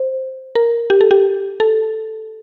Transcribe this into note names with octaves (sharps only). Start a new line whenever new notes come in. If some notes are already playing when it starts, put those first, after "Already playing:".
Already playing: C5
A#4
G4
A4
G4
A4